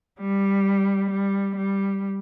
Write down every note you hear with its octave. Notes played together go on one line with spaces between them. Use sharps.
G3
G3
G3